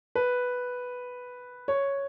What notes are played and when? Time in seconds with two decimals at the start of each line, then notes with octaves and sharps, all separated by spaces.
0.15 B4
1.68 C#5